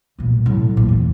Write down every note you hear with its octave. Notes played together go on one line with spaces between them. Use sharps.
B1 A#2
A2 F#3
A#1
E2